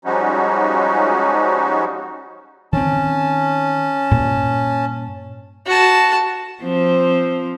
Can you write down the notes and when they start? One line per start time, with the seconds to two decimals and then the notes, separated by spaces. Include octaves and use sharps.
0.05 F3 G3 G#3 C#4 D#4 F#4
2.73 D#3 C4 C#4 A5
4.11 G2 A#2
5.66 F#4 A5
6.62 F3 C4